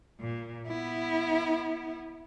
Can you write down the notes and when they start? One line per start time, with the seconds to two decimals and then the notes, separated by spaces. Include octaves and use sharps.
0.20 A#2
0.67 B3 E4